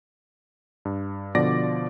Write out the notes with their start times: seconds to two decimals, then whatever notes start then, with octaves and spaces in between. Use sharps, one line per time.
0.85 G2
1.35 B2 D3 F3 D5 D6 A#6